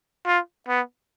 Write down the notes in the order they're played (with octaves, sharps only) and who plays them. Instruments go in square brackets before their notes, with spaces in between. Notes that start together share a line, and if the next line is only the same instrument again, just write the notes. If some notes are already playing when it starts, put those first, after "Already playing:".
[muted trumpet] F4
B3